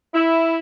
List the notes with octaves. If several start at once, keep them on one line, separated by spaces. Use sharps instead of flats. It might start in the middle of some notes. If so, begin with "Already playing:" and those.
E4